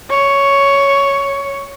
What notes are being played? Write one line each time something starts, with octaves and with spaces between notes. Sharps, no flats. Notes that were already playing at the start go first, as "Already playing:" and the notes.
C#5